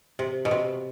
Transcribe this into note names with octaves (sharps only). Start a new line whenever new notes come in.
C3
B2
C3